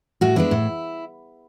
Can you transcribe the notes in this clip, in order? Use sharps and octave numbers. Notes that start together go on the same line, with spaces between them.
A2 F#4
G#3 B3 D4 E4
A2